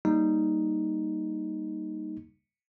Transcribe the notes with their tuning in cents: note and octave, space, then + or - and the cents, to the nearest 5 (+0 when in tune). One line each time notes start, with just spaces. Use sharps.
G3 +0 A#3 +0 D#4 +0